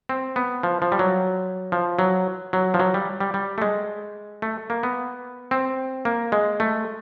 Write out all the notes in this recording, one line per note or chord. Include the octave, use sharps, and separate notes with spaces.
C4
B3
F3
F3
G3
F#3
F3
F#3
F#3
F3
F#3
G3
G3
G3
A3
G#3
A3
A#3
B3
C4
A#3
G#3
A3